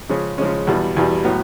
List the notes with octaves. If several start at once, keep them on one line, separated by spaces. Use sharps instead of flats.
C#3 F3 G#3 C#4
C#3 F3 G#3 C#4
E2 B2 G3
E2 B2 G3
A2 F#3 B3